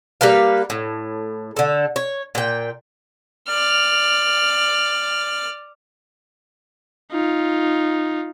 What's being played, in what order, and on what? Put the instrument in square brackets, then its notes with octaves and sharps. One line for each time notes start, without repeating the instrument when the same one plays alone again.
[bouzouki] G3 A#3 B4 F5
A2
D3 A4
C#5
A#2 G5
[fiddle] D5 F6
[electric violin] D#4 F4